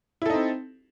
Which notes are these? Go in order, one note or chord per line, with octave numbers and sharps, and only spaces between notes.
C4 D#4 E4 A4